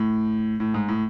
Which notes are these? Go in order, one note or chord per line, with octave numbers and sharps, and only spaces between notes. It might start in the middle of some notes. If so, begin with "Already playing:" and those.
Already playing: A2
A2
G#2
A2